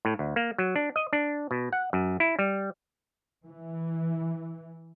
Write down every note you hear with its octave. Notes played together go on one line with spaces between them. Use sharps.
A2
D2
A#3
F#3
D4
D#5
D4
B2
F#5
F#2
E4
G3
E3